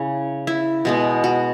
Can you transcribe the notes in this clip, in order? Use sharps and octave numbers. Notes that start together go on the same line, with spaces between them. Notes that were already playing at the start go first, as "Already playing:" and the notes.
Already playing: C#3 E4
E4
B2 G#3 B3
F#4